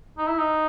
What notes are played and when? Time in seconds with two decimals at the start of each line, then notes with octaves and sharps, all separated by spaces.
0.18 D#4
0.27 E4
0.39 D#4